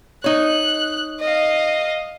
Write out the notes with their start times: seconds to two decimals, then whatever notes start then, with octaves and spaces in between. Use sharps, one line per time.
0.24 D#4 C#5 F#6
1.20 D#5 F5